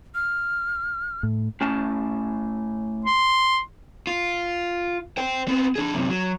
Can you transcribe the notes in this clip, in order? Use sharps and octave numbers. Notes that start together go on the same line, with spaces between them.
F6
A2
A2 C#4 A5
C6
F4
C5 G5
B3 C4
D4 G#4
F#2 C3
F#3